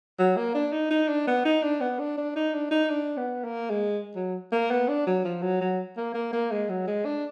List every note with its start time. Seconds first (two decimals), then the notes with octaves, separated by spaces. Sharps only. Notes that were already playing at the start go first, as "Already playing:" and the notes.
0.19 F#3
0.36 A#3
0.55 D4
0.72 D#4
0.90 D#4
1.08 D4
1.27 B3
1.45 D#4
1.63 D4
1.80 B3
1.99 D4
2.17 D4
2.36 D#4
2.54 D4
2.71 D#4
2.90 D4
3.17 B3
3.44 A#3
3.70 G#3
4.16 F#3
4.52 A#3
4.71 B3
4.88 D4
5.07 F#3
5.24 F3
5.42 F#3
5.61 F#3
5.97 A#3
6.14 A#3
6.33 A#3
6.51 G#3
6.69 F#3
6.87 G#3
7.05 D4